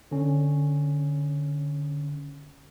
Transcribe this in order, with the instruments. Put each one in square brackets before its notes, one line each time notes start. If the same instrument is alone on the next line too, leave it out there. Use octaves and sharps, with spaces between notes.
[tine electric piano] D3 C#4